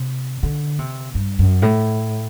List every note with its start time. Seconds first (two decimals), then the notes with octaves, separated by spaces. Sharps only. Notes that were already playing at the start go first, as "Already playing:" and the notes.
Already playing: C3
0.43 D3
0.79 C3
1.15 G2
1.39 F#2
1.62 A2